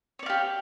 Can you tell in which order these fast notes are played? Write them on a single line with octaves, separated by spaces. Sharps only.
C#5 D5 F5 G4